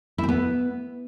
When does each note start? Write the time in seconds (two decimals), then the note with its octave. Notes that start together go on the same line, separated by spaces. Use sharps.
0.18 E4
0.23 C4
0.29 B3